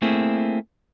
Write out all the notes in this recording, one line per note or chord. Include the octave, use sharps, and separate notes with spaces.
A3 A#3 C4 E4 G#4